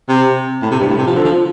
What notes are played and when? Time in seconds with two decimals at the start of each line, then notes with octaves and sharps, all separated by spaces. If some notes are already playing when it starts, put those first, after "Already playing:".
0.09 C3
0.62 A2
0.71 C3
0.80 G2
0.89 A2
0.98 C3
1.07 F3
1.16 D3
1.25 F3